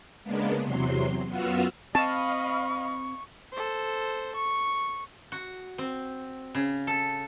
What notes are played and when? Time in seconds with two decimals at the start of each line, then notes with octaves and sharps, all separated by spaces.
0.24 C#3 G#3 A#3 B3 D4
0.62 E2 C3 F#3 C6
1.27 F#2 B3 F4 F#4 E6 F6
1.95 C4 D#5 F5 A5 B5 C#6
3.52 A4 C5
4.35 C#6
5.32 F#4
5.78 C4
6.55 C#3
6.87 A4